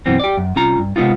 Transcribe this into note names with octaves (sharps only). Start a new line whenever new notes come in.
F#2 B2 E3 B3 C4
G4 D5
F#2
C2 C#4 F4 A#5
G2
C3 G#3 B3 D#4 F4